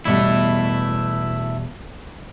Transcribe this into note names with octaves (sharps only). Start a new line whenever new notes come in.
E2 B2 G3 A3 E4